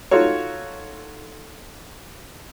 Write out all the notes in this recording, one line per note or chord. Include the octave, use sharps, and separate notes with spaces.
D#4 F4 F#4 A4 C#5